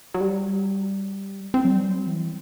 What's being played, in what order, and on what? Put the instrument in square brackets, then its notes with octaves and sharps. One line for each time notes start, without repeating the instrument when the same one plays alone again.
[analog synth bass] F#3
G3
C4
F#3
G3
F#3
E3